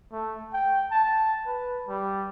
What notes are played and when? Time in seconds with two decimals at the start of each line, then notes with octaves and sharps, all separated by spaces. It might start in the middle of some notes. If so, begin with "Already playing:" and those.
0.12 A3
0.53 G5
0.91 A5
1.46 B4
1.88 G3